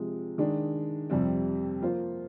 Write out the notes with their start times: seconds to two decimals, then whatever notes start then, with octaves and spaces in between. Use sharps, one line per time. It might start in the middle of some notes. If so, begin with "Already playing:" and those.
Already playing: C3 F3 G#3
0.38 D#3 G#3 D4
1.10 F2 C3 G3 C4
1.82 F3 A#3 F4 C5